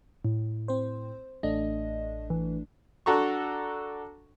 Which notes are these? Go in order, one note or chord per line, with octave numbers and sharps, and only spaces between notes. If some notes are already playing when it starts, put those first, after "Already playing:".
A2
C4 C5
A1 A3 D4 D#5
E3
D4 F#4 A4 A#5 C#6